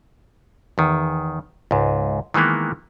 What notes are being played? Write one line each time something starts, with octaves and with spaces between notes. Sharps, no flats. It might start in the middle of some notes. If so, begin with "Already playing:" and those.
E2 D#3
C#2 G#2
D#3 E3 G#3 A#3 B3